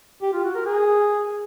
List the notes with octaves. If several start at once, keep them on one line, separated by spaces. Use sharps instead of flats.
G4
F4
F#4
A#4
G#4